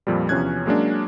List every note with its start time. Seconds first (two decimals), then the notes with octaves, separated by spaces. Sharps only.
0.07 F2 A#2 F3 G3
0.29 E2 C3 F3 C#4 F#6 G#6
0.66 F#3 G#3 A#3 C#4 D4